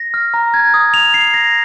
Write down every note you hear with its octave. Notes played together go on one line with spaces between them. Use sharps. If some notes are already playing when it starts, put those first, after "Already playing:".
Already playing: A#6
F6
A#5
G#6
D#6
F7
C7
A#6